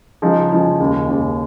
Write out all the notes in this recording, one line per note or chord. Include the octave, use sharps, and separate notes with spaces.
C#3 F3 G#3 D#4
C#3 F3 G#3 D#4
D#2 C#3 G#3
D#2 C#3 G#3